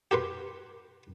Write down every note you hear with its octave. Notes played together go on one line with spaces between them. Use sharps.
G4 A#4 B4 C6